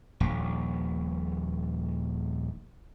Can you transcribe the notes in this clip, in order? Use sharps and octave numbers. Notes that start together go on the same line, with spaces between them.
D#1 A#1